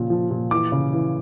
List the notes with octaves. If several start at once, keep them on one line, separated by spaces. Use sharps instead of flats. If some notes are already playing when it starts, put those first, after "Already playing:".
Already playing: A#2 C#3 F3
F3
A#2
E3 D6
C#3
E3